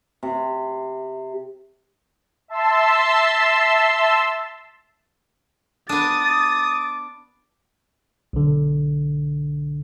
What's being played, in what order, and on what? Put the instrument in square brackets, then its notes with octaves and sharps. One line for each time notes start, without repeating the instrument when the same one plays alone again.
[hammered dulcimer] C3
[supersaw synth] E5 A5 C6 E6
[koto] B3 D4 [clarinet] D6 [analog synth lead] D#6 [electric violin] A6
[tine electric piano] B1 D3